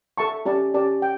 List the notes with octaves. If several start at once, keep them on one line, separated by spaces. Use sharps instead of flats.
A4 E5 A5 C#6
C#4 G4 D5 A5
C#4 G4 D5 A5
G5